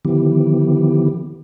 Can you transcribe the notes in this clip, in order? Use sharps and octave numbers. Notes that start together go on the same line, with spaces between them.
D3 D#3 F3 B3 E4 G4